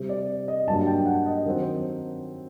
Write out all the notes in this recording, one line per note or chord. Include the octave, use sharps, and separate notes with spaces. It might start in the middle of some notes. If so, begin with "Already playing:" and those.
Already playing: C3 G3 C4
D5
D#5
G2 F#3 A#3 D4 A5
G5
F#5
D#5
D#3 F#3 C4 A#4